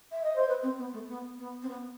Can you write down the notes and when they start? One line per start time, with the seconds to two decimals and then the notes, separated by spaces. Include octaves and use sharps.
0.11 E5
0.23 D#5
0.35 C5
0.48 B4
0.62 C4
0.78 B3
0.93 A3
1.08 B3
1.38 B3
1.62 C4
1.68 B3